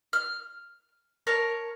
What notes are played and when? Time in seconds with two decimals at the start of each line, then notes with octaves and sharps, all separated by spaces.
0.13 F6
1.27 A#4 C#5 A5